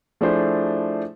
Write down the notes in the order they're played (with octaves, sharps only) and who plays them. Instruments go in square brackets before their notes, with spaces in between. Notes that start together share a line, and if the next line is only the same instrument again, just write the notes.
[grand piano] F3 A3 D4 E4 G#4 C5